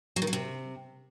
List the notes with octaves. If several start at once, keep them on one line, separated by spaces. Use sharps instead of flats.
F#3
D#3
F#3
C3